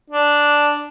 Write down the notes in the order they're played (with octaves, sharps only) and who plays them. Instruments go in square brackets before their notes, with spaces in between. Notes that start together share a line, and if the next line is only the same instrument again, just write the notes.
[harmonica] D4